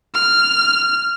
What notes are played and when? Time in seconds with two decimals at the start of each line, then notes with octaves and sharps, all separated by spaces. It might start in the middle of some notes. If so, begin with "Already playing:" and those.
0.14 F6